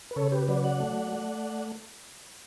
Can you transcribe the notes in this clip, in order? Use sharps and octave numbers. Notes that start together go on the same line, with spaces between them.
B4
C#3 A4 C#5
G4 B4
F#3 B4 D5
D5 F#5
A3
A3